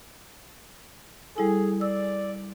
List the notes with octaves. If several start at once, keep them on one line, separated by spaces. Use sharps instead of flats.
G3 E4 G#4 A4
D5 E6